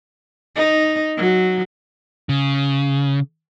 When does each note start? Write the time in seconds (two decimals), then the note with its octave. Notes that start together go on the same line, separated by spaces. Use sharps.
0.56 D#4
1.18 F#3
2.29 C#3